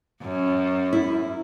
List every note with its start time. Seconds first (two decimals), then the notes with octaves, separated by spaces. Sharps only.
0.22 F#2
0.93 E4